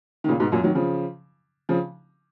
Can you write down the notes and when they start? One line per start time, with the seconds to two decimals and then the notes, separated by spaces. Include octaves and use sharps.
0.24 D#3
0.28 A#2 C#3
0.40 G#2 B2
0.52 F#2 A#2
0.64 D#3 F#3
0.75 C#3 F3
1.69 C#3 F3